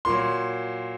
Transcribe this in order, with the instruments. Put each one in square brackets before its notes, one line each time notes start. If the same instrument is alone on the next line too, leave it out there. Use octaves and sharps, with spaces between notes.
[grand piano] A#2 F#3 C6